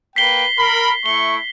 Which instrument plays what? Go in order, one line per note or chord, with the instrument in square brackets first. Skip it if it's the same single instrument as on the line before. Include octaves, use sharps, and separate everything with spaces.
[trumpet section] A#3 B4 G5 [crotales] B6 C7 G7
[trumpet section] A#4 B5
[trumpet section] A3 E4 C#6 [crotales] G7